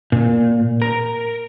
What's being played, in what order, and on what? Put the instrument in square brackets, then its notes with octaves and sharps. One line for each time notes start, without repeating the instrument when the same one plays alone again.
[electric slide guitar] A#2
A#4